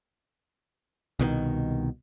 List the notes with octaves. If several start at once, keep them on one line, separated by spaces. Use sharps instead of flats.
C2 B2 D3 D#3